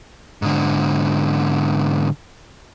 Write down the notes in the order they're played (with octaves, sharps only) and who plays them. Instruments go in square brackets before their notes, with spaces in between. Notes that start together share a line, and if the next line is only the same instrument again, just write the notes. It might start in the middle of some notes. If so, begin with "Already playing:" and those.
[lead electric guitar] G#2 D3